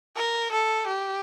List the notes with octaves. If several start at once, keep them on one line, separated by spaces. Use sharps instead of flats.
A#4
A4
G4